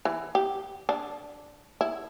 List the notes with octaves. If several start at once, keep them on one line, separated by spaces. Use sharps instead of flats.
E3
G4
D4
E4